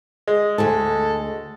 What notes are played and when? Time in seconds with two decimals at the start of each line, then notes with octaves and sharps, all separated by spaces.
0.28 G#3
0.58 D2 A4 G#5 A5